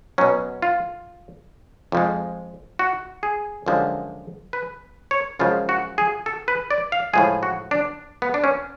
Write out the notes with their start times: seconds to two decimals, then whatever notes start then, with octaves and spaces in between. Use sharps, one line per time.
0.18 B2 F#3 C#4
0.62 F4
1.92 F2 F3 G#3
2.79 F#4
3.23 G#4
3.66 F#2 D3 F3 G#3
4.53 B4
5.11 C#5
5.39 F#2 C#3 F3 G#3 F4
5.69 F#4
5.98 G#4
6.26 A4
6.48 B4
6.71 D5
6.92 F5
7.13 A2 F3 G#3 G#4
7.43 F#4
7.71 D4
8.22 B3
8.34 D4
8.44 C#4